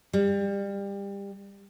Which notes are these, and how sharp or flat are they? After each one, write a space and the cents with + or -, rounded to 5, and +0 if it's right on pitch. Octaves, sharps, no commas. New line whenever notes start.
G3 +25